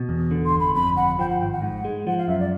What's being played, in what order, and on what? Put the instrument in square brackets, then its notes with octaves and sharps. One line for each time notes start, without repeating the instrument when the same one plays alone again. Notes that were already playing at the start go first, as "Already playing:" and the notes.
Already playing: [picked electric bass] B2
E2
D3
[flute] C6
[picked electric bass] G1
[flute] B5
[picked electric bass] F2 [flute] B5
[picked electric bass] G1 [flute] F#5
[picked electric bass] F3 [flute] G5
[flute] F#5
[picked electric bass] G#1 [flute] G5
[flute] F#5
[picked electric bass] G#2
G#3
[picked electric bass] F3 [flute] F#5
[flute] F5
[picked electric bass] F#2 [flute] E5
[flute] D5